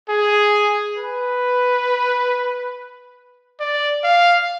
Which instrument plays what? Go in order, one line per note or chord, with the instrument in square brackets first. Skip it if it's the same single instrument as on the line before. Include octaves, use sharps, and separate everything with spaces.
[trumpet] G#4
B4
D5
F5